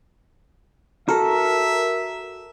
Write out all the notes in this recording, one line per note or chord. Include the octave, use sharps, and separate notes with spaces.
F#4 A4 A#4 E5